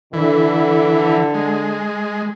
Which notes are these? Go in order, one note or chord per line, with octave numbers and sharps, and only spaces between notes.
D3 E3
G#3